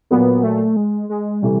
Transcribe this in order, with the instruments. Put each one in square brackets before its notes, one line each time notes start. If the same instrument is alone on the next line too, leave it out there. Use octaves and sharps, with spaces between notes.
[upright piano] A#2 F#3 A#3 [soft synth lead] B3
[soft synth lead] A3
G#3
G#3
[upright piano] C3 E3 A3 [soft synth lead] G3